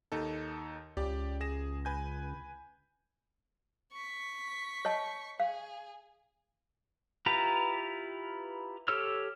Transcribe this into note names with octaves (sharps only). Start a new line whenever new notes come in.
D#2 D#4 A4
C#2 G4 D5
G#4 A#6 E7
B4 G#5 G6
C#6 B6
C#5 D#5 A5
G#4 F5
E4 F4 G4 B4 A#5
G4 A4 C#5 E6 F6